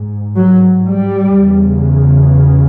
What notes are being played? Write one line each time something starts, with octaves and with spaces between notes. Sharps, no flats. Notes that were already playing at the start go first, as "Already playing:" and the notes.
Already playing: G#2
F#3
G3
E2 C#3